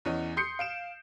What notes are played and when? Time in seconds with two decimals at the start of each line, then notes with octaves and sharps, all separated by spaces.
0.05 E2 E3 C#4 D#5
0.37 C6 D#6 G6 C7 C#7
0.59 F5 D7 E7